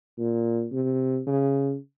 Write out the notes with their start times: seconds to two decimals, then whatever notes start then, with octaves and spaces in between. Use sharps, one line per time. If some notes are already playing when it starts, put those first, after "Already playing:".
0.18 A#2
0.73 C3
1.27 C#3